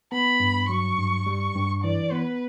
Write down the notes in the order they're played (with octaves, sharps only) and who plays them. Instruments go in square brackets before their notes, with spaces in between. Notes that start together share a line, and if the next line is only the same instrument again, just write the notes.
[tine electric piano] B3 [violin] B5
[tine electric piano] G2
[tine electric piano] F#3 [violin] C#6
[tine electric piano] G2
G3
G2
[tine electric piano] E3 [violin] D5
[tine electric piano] B3 [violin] B4